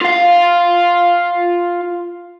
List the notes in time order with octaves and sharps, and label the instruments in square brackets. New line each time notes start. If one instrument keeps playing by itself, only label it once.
[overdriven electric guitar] F4 F5